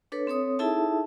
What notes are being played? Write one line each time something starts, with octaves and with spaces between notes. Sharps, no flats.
D4 A4 B4 C#5
C4 A4 C#5 D#6
D#4 E4 G#4 A4 E5 A5